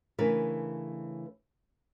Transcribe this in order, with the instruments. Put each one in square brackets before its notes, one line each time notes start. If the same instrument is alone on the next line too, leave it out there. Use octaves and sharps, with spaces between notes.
[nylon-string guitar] C#3 E3 A3 D4 A#4 B4